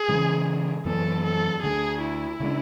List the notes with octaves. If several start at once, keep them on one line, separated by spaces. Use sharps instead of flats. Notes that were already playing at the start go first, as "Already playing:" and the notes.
Already playing: G#4
C#3 E3 G#3
F#2 E3 B3 A4
A4
D2 D3 A3 G#4
E4
C#3 G#3 D4